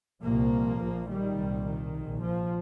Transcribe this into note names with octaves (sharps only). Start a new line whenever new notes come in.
C2 A#2 F3 A#3
A#1 A#2
D#3 G3
C2 A#2
D#3
A#1 A#2
F3